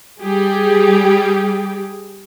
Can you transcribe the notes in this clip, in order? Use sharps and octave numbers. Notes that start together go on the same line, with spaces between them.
G3 G4 G#4